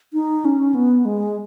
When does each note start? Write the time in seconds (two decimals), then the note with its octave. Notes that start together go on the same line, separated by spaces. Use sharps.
0.13 D#4
0.45 C#4
0.75 B3
1.05 G#3